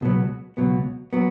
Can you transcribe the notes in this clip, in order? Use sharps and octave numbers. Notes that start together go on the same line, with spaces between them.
C#2 B2 F#3 B3
C#2 B2 F#3 B3
F#3 B3